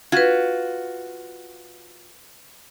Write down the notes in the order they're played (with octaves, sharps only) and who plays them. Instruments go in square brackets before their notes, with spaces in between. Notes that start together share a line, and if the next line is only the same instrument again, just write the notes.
[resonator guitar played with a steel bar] F4 F#4 [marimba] B4 G#6